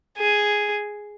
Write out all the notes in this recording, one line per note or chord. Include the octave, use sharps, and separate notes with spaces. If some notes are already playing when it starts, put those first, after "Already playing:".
G#4